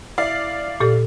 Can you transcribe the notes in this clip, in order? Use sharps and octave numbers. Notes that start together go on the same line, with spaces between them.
E4 D5 F5
A#2 G4 A4